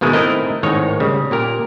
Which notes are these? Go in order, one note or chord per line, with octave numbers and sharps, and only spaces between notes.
G#2 B2 D#3 G#3 A3
A3 C4 D#4 E4 A#4 D#5
G#1 A2 D#3 D#4 C#5
C#3 G3
A#2 G4 A#4